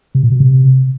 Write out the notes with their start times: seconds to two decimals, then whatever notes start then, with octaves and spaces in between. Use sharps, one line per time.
0.15 C3
0.23 A#2
0.32 B2
0.40 C3